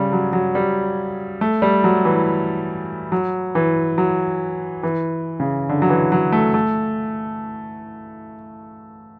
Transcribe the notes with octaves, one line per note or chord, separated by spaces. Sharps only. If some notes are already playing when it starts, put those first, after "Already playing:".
Already playing: C#3 G3
F#3
F#3
G3
A3
G3
F#3
E3
F#3
E3
F#3
E3
C#3
D3
F#3
E3
F#3
A3
A3